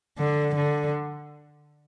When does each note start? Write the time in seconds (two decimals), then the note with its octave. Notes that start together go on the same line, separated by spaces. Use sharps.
0.18 D3
0.55 D3